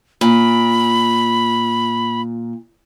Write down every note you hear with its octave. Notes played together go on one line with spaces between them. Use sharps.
A#2 B5